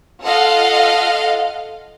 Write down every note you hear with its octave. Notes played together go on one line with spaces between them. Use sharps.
F4 A4 D#5 F5 F#5